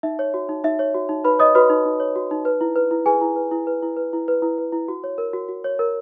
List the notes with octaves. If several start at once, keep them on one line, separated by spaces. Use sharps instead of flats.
D#4 E5
C#5
F#4
D#4
D#4 E5
C#5
F#4
D#4
D#4 B4 B5
C#5 D#5 D#6
F#4 B4 B5
D#4
D#4
C#5
F#4
D#4
B4
E4
B4
E4
G#4 B4 G#5
E4
B4
E4
B4
E4
B4
E4
B4
E4
B4
E4
F#4
C#5
A#4
F#4
F#4
C#5
A#4